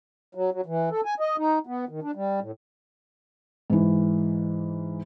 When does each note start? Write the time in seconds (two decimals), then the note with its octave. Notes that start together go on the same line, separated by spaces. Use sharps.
0.35 F#3
0.53 F#3
0.66 E3
0.91 A4
1.05 G#5
1.20 D#5
1.38 D#4
1.67 B3
1.89 D#3
2.02 D4
2.15 G3
2.41 A2
3.70 G#2 E3